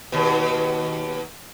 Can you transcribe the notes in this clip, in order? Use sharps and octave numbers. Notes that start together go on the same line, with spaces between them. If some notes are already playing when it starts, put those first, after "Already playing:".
D#2 B2